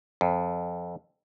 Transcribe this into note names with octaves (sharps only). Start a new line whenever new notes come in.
F2